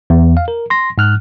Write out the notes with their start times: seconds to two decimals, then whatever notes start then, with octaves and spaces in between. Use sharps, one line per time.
0.10 E2
0.37 F5
0.48 A#4
0.70 C6 A#6
0.98 G#2 F6 F#6